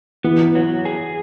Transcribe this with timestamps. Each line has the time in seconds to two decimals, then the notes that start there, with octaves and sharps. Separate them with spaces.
0.24 E3 B3
0.55 F#3
0.85 G#4